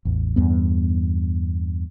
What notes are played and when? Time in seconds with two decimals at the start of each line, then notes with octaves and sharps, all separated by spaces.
0.05 A1 E2
0.36 E2 G2 B3